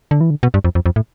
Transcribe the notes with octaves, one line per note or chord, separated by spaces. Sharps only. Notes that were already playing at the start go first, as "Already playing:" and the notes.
D3
E3
D3
B2
G2
F2
F2
F2
A2